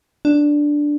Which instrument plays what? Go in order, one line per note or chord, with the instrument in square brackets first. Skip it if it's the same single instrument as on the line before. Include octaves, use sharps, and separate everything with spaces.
[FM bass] D4